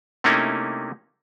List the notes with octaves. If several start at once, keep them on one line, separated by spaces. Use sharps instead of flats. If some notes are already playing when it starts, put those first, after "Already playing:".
C3 A3 A#3 C#4 D#4 E4